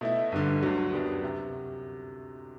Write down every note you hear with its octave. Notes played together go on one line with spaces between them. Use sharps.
B2 A3 E4
G1 G2 D3
D2 D3 F#3
F#2 F#3 B3 D4 G4
C3